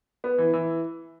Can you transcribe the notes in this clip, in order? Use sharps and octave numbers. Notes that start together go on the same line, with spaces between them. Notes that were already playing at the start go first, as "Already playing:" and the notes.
B3
E3
E3